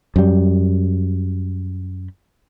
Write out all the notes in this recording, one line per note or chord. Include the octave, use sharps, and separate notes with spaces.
F#2 G3